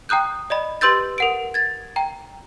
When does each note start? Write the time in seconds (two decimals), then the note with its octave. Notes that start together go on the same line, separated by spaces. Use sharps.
0.09 G5 A#5 D#6 F#6 G6
0.50 D5 D#5 B5
0.81 G4 B4 C6 E6 G6 A6
1.18 A#4 F#5 D7
1.54 G#6 A6
1.96 G5 A#5